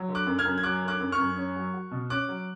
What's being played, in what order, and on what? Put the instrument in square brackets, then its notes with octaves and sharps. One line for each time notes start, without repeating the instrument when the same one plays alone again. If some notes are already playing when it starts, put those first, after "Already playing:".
Already playing: [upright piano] F#3
D3
[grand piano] D6 F#6
[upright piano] F#2
[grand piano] F6 G#6
[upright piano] F#2
[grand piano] G#6
[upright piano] F#3 [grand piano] D6 F#6
[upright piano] D3
[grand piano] D6 F#6
[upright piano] F#2
[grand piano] C#6 F6
[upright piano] F#2
C#4
F#3
F#4
B2
[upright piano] C#4 [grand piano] D6 F#6
[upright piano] F#3